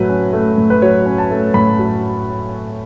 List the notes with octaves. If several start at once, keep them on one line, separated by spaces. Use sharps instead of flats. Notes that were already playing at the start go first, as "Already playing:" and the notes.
Already playing: A2 F#3 A3 B4
C#4
A3
A2
B4
F#3 C#5
C#4
A5
A3
A2 B5
F#3